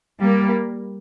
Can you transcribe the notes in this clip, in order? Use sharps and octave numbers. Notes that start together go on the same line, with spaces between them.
G3 A#3